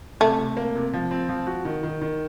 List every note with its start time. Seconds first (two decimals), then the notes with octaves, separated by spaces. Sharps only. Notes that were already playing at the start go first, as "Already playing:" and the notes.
0.20 C3 A3
0.39 C3
0.57 A#3
0.75 C3
0.93 F3
1.11 C4
1.29 F3
1.47 F#4
1.65 D#3
1.83 D#3
2.02 D#3